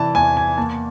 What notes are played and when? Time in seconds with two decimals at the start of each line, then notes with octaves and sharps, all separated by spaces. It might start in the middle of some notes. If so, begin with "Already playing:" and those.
Already playing: C3 E3 D5 A5
0.15 E2 G#5
0.37 G#5
0.58 A#3 A5